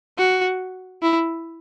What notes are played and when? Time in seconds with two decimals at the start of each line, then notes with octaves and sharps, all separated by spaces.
0.18 F#4
1.02 E4